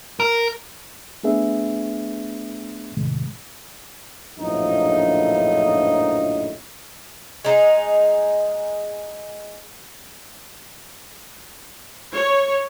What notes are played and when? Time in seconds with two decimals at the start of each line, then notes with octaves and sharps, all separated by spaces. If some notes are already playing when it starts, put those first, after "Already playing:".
0.20 A#4
1.23 A3 B3 D4 G#4 B4 E5
2.97 E2 A2 C3 D#3 G#3
4.39 A#1 F#2 A2 D3 F3 D#4
7.44 G#3 D#4
12.13 C#5